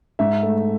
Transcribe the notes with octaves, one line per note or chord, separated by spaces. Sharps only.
G#2 E5
A3